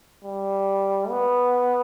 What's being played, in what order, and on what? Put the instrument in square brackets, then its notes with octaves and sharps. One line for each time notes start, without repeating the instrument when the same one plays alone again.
[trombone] G3
B3